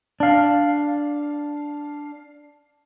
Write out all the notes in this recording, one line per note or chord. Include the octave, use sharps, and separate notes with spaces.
D4 F5